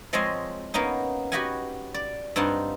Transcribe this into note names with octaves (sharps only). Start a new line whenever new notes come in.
F3 G#3 C4 F4 C#5 D#5
A#3 B3 C#4 D#4
F#4 G4 B4 D#5 F#5 G#5
D5
G2 C4 D#4 F4 F#5